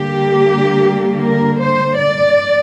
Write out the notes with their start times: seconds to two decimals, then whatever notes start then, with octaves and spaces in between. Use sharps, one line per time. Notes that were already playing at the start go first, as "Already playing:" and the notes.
Already playing: D3 G3 A#3 G4
1.23 A#4
1.60 C5
1.98 D5